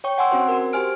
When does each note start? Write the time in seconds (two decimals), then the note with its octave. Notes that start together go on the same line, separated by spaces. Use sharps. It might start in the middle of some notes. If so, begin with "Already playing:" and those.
0.04 C#5 G5 C#6
0.18 F#5 G#5 C6 E6
0.31 C4 C#4 F#4 C5
0.48 F#4 A#4
0.73 G4 C5 G#5 F6 D7